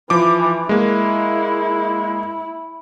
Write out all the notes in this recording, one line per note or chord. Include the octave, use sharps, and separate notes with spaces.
E3 F3 D6
G#3 A#3 E4